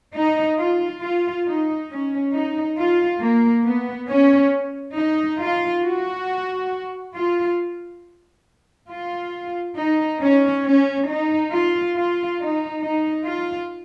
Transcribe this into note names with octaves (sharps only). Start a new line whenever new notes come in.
D#4
F4
F4
D#4
C#4
D#4
F4
A#3
B3
C#4
D#4
F4
F#4
F4
F4
D#4
C#4
C#4
D#4
F4
F4
D#4
D#4
F4